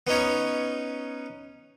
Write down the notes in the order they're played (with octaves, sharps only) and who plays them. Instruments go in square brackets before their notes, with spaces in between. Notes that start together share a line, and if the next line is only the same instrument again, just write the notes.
[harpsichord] B3 C#4 D#4 C#5